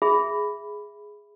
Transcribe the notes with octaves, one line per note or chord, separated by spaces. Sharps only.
G#4 E5 B5